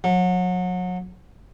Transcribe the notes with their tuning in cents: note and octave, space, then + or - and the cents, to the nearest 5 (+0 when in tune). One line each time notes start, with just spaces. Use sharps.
F#3 -30